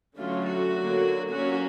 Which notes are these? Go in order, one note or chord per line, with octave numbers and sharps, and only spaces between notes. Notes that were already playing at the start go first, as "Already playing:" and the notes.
D3 F#3 A3 C#4 F4
F#4
D3 F#3 A#3
F#3 A#3 C#4 F#4